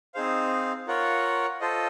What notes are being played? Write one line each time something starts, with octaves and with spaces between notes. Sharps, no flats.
C4 D#4 G#4 C5 F5
F4 A#4 C#5 F#5
F4 A4 C5 D#5